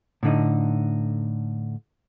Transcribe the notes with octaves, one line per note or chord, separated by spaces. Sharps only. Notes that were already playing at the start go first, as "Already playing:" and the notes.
A2 D3 D#4